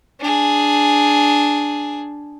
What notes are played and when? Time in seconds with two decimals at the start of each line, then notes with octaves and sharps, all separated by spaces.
0.20 D4 G#4